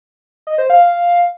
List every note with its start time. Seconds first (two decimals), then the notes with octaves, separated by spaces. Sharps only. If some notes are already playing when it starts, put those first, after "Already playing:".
0.47 D#5
0.58 C5
0.70 F5